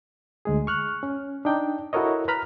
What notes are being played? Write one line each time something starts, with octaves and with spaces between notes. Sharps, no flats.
D2 G#3 G#4
C#6 F6 F#6
C#4
D4 D#4 G5
E4 F#4 A4 A#4 C#5 D#5
B4 A#5 B5 F6